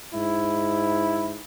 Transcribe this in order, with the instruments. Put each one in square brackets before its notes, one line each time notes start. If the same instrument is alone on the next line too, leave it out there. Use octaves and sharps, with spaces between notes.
[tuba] G#2 [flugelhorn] E4